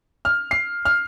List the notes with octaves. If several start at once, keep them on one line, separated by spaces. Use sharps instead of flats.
F6
C7
F6